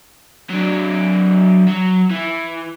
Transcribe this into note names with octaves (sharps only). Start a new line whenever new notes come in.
F#3 D4
F#3
E3